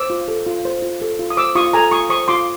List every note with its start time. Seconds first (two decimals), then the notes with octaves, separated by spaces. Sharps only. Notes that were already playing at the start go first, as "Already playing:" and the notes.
Already playing: C5 D6 E6
0.10 F4
0.28 A4
0.46 F4
0.65 C5
0.82 F4
1.02 A4
1.19 F4
1.30 D#6
1.37 C5 D6 E6
1.55 F4 C#6 D#6
1.73 A4 G#5 A#5
1.91 F4 C#6 D#6
2.10 C5 C#6 D#6
2.28 F4 C6 D6